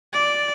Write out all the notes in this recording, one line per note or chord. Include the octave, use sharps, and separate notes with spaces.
D5